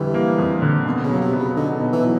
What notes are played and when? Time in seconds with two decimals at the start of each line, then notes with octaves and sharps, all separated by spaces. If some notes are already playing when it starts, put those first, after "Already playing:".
Already playing: F2 D3 E3 G3
0.14 A#3
0.38 F2
0.62 D3
0.86 B2
1.03 C#3
1.09 F#3
1.21 C3
1.33 B3
1.38 C#3
1.56 D3 D#4
1.80 B2
1.92 E3
2.04 F#3